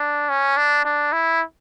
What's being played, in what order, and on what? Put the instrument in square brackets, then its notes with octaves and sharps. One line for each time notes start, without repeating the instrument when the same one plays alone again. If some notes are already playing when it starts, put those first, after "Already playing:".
Already playing: [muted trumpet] D4
C#4
D4
D4
E4